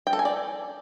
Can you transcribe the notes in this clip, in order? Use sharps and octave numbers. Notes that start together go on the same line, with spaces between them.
G5
A4
G#5
D5